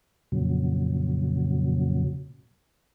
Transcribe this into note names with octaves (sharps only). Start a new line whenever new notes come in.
F2 A#2 C#3 F#3